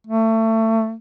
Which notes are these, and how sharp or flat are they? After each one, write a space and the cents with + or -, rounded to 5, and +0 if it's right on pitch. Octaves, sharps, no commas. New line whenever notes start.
A3 +25